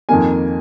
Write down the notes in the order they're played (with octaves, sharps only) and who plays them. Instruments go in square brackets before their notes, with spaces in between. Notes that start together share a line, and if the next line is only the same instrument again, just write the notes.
[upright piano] F2 D#3 A#3 G#5